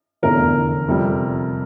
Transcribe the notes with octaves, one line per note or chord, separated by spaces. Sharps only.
F1 E2 D3 A#4
F2 C3 G3